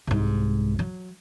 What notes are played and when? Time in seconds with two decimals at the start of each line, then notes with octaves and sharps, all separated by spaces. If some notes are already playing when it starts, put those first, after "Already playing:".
0.07 C2 G#2
0.79 F#3